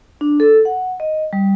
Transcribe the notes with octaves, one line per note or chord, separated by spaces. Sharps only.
D4
A4
F#5
D#5
G3